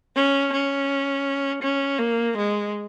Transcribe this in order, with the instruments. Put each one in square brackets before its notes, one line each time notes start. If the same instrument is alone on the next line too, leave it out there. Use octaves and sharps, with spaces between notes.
[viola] C#4
C#4
C#4
A#3
G#3